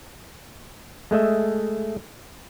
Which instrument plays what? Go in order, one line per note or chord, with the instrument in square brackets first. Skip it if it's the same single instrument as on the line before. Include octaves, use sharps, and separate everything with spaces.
[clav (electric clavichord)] G#3 A3 D#5 E5